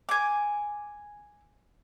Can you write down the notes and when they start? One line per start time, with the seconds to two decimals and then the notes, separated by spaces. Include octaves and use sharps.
0.09 G#5 D6